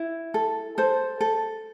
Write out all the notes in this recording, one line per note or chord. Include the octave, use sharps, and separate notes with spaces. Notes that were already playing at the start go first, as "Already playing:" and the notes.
Already playing: E4
A4
A4 C5
A4